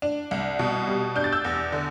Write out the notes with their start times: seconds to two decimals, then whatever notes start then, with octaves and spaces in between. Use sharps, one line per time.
0.02 D4
0.31 C2
0.59 B2
0.88 G3
1.16 D4 G6
1.24 A6
1.32 E6 G6
1.45 E2
1.72 D3